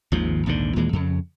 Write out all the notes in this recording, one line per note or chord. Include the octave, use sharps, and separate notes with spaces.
G#1 D#2 G#2 F3
A#1 D#2 G#2 D3
D#2 A#2 E3 G#3
F2 C#3